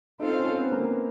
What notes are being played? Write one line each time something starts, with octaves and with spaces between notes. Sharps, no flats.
C4 D#4 F4 A4 C5 F5
C#4
C4
B3
A#3
B3